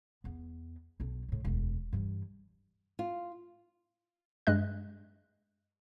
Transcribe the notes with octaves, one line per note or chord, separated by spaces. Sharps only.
E2 B3
B1 D4
A2 C#3
E1 D2
G2 E3
F4
G2 G#3 D#5 F#6